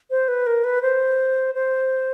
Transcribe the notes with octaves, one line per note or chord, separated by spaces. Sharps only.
C5
B4
A#4
B4
C5
C5